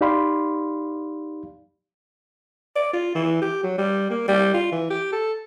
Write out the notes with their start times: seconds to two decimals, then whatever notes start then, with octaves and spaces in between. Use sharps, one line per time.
0.01 D#4 G4 D5 F5 B5 C6
2.76 D5
2.93 F4
3.15 E3
3.42 G4
3.63 F#3
3.78 G3
4.10 A#3
4.28 G3
4.54 F4
4.72 E3
4.90 G4
5.12 A4